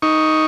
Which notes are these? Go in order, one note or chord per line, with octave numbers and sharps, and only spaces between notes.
D#4 C#6